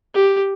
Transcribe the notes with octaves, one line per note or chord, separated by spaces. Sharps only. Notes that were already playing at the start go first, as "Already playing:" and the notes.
G4